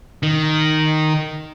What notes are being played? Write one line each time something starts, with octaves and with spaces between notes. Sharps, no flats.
D#3